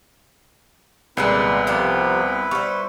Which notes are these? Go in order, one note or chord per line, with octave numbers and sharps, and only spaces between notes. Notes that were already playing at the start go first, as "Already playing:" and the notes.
C2 A#2 D3 G#3 B3 E4 B4
C3 F3 G4
G3 C5 C#6